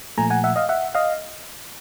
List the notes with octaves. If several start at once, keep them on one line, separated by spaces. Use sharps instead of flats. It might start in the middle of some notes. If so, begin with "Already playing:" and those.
A#2 F3 A3 G#5 A#5
F#5 G#5
E5 F#5
D#5 F5
E5 F#5
D#5 F5